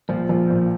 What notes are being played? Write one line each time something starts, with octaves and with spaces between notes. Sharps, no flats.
A#1 F3
A#1
A#2